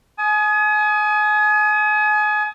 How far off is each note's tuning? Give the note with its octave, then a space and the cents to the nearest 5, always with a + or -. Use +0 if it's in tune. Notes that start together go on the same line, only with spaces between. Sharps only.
G#5 +35 D#6 +0